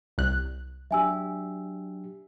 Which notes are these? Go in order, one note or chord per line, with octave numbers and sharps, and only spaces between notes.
C2 F#6
F#3 D4 G4 E5 G#5 E6